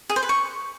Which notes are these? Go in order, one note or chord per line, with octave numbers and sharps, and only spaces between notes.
G#4
C5
B4
C#6